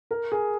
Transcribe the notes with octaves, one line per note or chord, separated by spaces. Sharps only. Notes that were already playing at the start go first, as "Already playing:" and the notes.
A#4
G#4